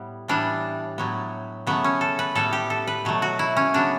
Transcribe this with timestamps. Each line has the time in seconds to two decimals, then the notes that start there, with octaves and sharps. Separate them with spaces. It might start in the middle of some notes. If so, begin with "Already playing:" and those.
Already playing: A2 G3 B3
0.28 A2 E3 G3 B3 D4
0.98 A2 F#3 B3
1.67 C#3 F#3 A3 B3
1.84 C#4
2.01 A4
2.19 B4
2.35 A2 G3 B3 A4
2.53 G4
2.70 A4
2.87 B4
3.05 B2 F#3 A3
3.22 F#4
3.39 E4
3.56 C#4
3.74 C#3 F#3 B3 D4